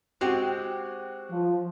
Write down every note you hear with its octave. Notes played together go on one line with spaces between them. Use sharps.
G#3 C4 F#4 G4
F3